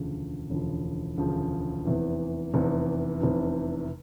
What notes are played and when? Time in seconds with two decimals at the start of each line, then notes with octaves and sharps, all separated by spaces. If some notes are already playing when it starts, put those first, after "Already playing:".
Already playing: E1 D2 C#3 F3
0.50 E1 D2 C#3 F3
1.18 E1 D2 C#3 F3
1.85 F1 E2 C3 E3
2.54 F1 E2 C3 E3
3.21 F1 E2 C3 E3